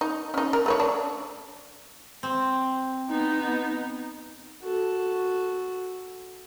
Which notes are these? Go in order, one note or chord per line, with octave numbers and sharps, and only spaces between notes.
D#4
C#4 D#4
A#4
A3 B4 C#5
D4
C4
B3 D#4
F#4 A4